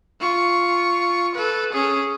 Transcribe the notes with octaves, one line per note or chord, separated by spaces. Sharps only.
F4 C#6
A4 B4
C#4 G#4